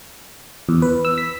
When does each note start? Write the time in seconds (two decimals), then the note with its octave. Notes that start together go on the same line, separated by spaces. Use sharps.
0.69 E2
0.82 B4
1.05 E6
1.18 B6